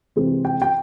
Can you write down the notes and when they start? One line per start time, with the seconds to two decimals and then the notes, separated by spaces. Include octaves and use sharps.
0.16 C3 E3 G#3 C4
0.45 G5
0.62 G5